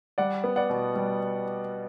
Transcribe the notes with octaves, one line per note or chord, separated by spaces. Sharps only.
G3 D5 F#5
B3
D5 F#5
B2
G3